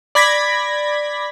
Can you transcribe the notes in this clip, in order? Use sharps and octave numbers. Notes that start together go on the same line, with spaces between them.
D5 B5 G#6 A#6 B6